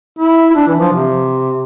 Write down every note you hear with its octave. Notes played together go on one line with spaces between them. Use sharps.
E4
E4
D4
E3
F3
C3